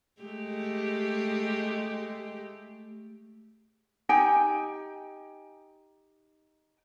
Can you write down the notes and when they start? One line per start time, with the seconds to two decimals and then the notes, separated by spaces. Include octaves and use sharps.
0.22 G#3 A3 G4
4.09 D#4 G4 G5 G#5